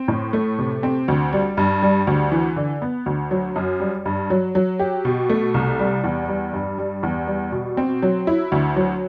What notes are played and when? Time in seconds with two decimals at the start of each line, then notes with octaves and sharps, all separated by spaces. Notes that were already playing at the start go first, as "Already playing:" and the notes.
Already playing: C4
0.08 A2
0.33 A3
0.59 C3
0.83 C4
1.08 D2
1.33 G3
1.57 G2
1.83 G3
2.07 D2
2.32 E3
2.56 D3
2.82 B3
3.06 D2
3.31 F#3
3.56 F#2
3.80 G3
4.05 G2
4.30 F#3
4.55 F#3
4.79 G4
5.05 B2
5.30 A3
5.54 C2
5.79 G3
6.04 E2
6.28 G3
6.53 G2
6.78 G3
7.03 E2
7.28 G3
7.52 B2
7.77 C4
8.02 F#3
8.27 E4
8.52 D2
8.76 F#3